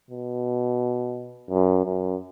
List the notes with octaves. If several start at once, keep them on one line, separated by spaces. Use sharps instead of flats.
B2
F#2
F#2